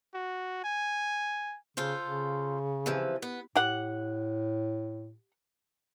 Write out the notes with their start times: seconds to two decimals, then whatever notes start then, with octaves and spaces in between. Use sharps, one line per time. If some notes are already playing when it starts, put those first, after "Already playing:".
0.14 F#4
0.64 G#5
1.77 C#3 F4 A4 C5
2.03 C#3
2.86 C3 E3 F3
3.22 B3
3.56 A2 G4 F#5